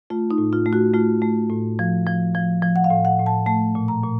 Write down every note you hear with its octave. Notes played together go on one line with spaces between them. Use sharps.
A3 F4
D#4
A2
F4
A3
F#4
A3 F4
A3
A2
F3
F3
F3
F3
F#5
F5
A2
F#5
A2
A5
A3 A5
A#2
A#5
A#2